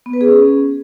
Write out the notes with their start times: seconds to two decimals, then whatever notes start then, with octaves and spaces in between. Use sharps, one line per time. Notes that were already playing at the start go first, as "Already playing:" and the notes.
0.06 B3
0.13 B4
0.21 G#4
0.28 C#4